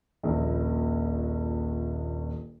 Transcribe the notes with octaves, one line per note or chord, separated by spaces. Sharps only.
D#1 A#1